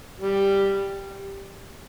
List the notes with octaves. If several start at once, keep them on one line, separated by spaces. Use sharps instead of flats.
G3